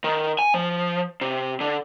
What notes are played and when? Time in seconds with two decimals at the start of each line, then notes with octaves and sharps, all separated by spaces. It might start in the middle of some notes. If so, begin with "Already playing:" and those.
0.04 D#3
0.39 G#5
0.54 F3
1.21 C3
1.61 D3